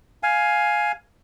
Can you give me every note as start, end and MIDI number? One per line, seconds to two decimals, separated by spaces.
0.23 0.92 77
0.23 0.92 80